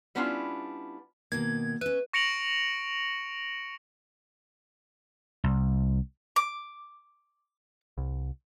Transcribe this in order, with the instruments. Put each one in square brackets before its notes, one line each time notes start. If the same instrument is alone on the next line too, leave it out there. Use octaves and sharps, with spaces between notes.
[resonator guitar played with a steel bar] G3 B3 C#4 D4 E4 F4
[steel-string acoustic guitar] B2 D#3 A#3 [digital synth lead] G#6
[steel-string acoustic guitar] C#4 E5 [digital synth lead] B4
[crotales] C#6 A#6 C#7 D7 F7 F#7
[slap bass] C2
[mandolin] D6
[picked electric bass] C2